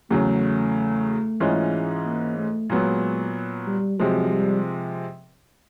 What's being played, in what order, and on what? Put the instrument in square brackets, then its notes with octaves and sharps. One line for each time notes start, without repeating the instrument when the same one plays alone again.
[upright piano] E2 C#3 F#3 [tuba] A3
[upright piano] G#2 E3 G#3 C#4 F4
[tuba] A#3
A3
[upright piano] A#2 F#3 B3 [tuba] G#3
[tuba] G3
[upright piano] C3 F3 G#3 [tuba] F#3
[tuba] G3